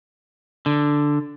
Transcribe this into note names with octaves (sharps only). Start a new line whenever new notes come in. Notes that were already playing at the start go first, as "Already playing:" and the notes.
D3